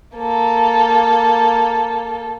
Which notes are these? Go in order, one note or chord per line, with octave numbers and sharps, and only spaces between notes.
A#3 A4